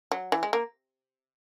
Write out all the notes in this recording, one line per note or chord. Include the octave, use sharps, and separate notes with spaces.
F#3
E3
G#3
A#3